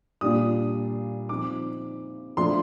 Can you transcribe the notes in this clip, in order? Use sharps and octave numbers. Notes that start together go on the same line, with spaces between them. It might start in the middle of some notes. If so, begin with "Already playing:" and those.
A#2 G3 D4 F4 D#6
F3 C4 D#4 D6
F3 A3 D4 F4 C6